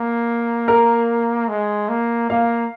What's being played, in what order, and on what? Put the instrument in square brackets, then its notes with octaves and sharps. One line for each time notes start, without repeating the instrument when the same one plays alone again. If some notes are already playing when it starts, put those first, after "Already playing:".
Already playing: [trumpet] A#3
[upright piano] A#4
[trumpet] G#3
A#3
[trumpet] A#3 [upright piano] F5